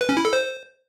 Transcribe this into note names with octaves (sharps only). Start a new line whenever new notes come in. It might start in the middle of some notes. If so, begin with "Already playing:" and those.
B4
C#4
E4
A4
C5